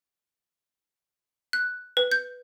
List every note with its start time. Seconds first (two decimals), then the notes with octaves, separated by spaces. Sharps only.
1.53 F#6
1.97 B4
2.12 G6